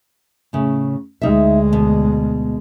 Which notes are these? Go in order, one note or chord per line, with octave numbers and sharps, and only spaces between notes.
A2 C#3
D2 G#3 D#4 E5
B2